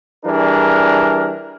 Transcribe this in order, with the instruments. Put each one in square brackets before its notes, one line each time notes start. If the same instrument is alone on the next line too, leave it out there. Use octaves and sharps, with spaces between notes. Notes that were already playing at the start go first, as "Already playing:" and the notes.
[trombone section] E3 G3 D4 G#4 A#4